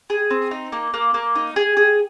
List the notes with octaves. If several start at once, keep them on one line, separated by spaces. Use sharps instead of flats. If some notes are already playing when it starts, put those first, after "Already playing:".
G#4
C4
D#4
A#3
A#3
A#3
D#4
G#4
G#4